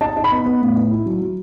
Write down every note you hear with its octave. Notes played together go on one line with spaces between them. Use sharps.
D#4 A5
D#4
B5
B3
B3
A2
D#4
E4
F#3
F#3